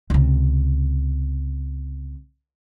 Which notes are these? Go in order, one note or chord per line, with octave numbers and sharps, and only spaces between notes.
C#2 C3